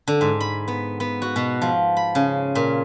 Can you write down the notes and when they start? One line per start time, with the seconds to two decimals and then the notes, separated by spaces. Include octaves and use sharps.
0.08 D3
0.21 G#2
0.40 B5
0.68 B3
1.00 B3
1.22 F#4
1.36 B2
1.62 F3
1.97 B5
2.15 C#3
2.55 A#2